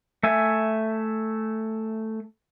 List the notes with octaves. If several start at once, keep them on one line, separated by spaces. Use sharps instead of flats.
A3 E5 G#5